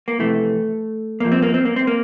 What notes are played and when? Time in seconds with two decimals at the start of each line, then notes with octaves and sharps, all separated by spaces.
0.08 A#3
0.19 F2 C3 E3 A3
1.20 G2 F3 A#3
1.32 C4
1.42 A#3
1.54 C4
1.65 A#3
1.76 C4
1.87 A#3